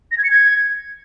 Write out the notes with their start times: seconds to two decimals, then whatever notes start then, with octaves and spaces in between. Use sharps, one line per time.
0.12 A#6
0.18 G#6
0.24 C#7
0.30 G#6